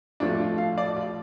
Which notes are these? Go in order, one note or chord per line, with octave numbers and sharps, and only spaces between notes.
F2 F3 A3 D4
F4
F5
D5
F4